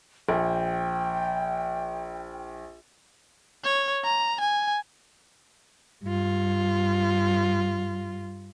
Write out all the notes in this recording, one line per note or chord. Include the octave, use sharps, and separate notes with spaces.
A#1 G5
C#5
A#5
G#5
G2 F4